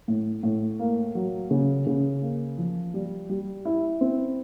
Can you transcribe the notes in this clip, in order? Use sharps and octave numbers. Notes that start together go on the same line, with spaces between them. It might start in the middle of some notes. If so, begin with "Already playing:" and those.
A2
A2
A#3
F#3
C#3
C#3
A#3
F3
G3
G3
E4
C4